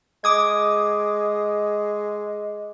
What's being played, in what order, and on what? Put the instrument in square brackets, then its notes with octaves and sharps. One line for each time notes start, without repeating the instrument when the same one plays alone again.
[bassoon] G#3 [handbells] D6 D#6 G#6